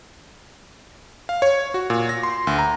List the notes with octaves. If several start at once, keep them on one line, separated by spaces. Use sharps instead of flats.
F5
C#5
F#4
A#2
A#6
C6
D2
A#5